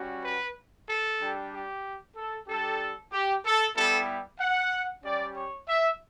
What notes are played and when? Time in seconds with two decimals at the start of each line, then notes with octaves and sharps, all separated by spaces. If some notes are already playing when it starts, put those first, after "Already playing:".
Already playing: G3 C#4 F#4
0.24 B4
0.87 A4
1.19 G3 D4 G4
1.51 G4
2.15 A4
2.47 G3 D4 G4 A4
3.11 G4
3.44 A4
3.76 G3 B3 E4 G4 A4
4.39 F#5
5.02 G3 C#4 G4 D5
5.35 C#5
5.67 E5